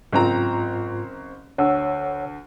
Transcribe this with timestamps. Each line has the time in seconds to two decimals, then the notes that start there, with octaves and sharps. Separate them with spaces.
0.13 F#1 G#2 C4 F4 A#5
1.58 D2 C#5 F#5 E6